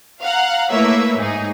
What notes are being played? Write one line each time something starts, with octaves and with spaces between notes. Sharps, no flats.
F5 F#5 A#5
A3 A#3 E4 B4 C#5 E5
G#2 D#4 G#4